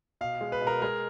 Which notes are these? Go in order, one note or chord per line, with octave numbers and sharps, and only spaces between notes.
B2 F5
G#3
B4
B2
A#4
G#3 A#4